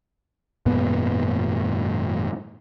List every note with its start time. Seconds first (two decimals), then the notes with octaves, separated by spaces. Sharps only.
0.66 G#1 F#2 A#2 B3